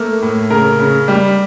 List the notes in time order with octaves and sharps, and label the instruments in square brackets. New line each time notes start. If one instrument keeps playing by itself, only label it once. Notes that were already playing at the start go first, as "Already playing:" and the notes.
Already playing: [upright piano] A3 A#3
A2
C#3 A#4
C#3
G3